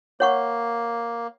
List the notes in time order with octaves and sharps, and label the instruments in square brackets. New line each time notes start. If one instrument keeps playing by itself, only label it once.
[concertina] A#3 [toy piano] C#5 F#5 C#6